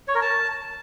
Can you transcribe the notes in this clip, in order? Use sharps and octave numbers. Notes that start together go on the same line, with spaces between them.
C#5
A#4
A5